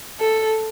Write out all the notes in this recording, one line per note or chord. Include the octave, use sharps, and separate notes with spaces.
A4